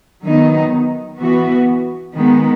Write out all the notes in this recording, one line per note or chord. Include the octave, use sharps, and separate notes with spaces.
D#3 F#3 B3 D#4
E3 B3 F#4
D#3 G#3 B3